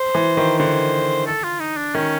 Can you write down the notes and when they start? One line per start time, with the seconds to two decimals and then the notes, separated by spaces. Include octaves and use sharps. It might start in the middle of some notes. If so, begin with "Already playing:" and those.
Already playing: C5
0.15 E3
0.37 D#3
0.59 D3 C5
1.27 A4
1.44 F4
1.60 D#4
1.77 D4
1.94 D#3 C#4